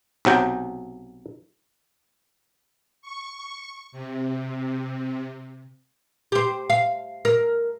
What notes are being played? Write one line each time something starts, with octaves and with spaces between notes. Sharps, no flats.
B1 C3 F#3 G5
C#6
C3
G4 C5
F5
A#4